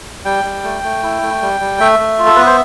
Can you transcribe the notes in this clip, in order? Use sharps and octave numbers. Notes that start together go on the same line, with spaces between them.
G3 G5
G3
A3
A3
E4
A3
G3
G3
A3 E5
A3
F4
A4
B3 B4
C5